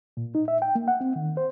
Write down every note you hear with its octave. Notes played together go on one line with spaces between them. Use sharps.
A#2
D#4
E5
G5
A#3
F#5
C4
D#3
C5